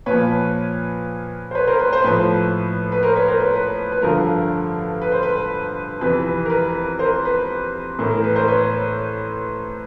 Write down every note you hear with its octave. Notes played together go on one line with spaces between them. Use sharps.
A#2 F3 B4 C#5
C5
B4 C#5
A#4 C5
B4
C5
A2 F3 B4
B4
A#4 C5
B4 C#5
A#4 C5
B4
B4
B4
G2 D3 F3 A#4
B4
C5
B4
F2 C3 E3 B4
A#4
B4
A#4 C5
B4
A2 E3 A#4
A#4
B4
A#4 C5
B4 C#5